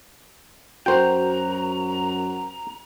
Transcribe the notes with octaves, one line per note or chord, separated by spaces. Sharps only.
F#2 F#4 A#4 C5 G5 A#5